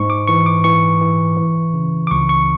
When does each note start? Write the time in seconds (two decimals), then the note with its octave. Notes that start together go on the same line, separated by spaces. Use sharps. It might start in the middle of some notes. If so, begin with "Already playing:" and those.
Already playing: G#2 C#6
0.10 D6
0.27 E3 C#6
0.46 D6
0.64 E3 C#6
1.01 E3
1.37 E3
1.74 C#3
2.07 D6
2.11 C#2 C#6
2.29 C#6